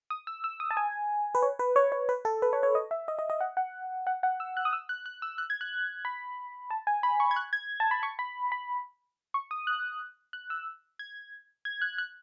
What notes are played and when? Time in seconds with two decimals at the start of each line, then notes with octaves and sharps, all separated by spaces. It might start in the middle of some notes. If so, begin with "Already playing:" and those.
0.10 D#6
0.27 E6
0.44 E6
0.60 D#6
0.71 A5
0.77 G#5
1.35 B4
1.42 C#5
1.59 B4
1.76 C#5
1.92 C#5
2.09 B4
2.25 A4
2.42 B4
2.53 C#5
2.63 C#5
2.75 D#5
2.91 E5
3.08 D#5
3.19 D#5
3.30 D#5
3.40 F#5
3.57 F#5
4.07 F#5
4.23 F#5
4.40 E6
4.57 F#6
4.65 D#6
4.73 E6
4.89 F#6
5.06 F#6
5.22 E6
5.38 F#6
5.50 G#6
5.61 F#6
6.05 B5
6.70 A5
6.87 G#5
7.03 B5
7.20 C#6
7.31 G#6
7.36 F#6
7.53 G#6
7.80 A5
7.91 B5
8.03 C#6
8.19 B5
8.52 B5
9.34 C#6
9.51 D#6
9.67 F#6
10.33 F#6
10.50 E6
10.99 G#6
11.65 G#6
11.82 F#6
11.98 F#6